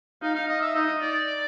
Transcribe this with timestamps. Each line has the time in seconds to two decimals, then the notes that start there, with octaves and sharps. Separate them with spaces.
0.22 D#4 F5
0.35 F5
0.48 D#5
0.62 E5
0.75 D#4 D#5
1.01 D5